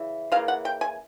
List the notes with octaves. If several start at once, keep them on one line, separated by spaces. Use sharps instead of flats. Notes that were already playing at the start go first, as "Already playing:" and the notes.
Already playing: C#3 E3
C#3 E3 A#3 F5
F#5
G5
G#5